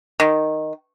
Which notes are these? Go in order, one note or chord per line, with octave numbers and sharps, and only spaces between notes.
D#3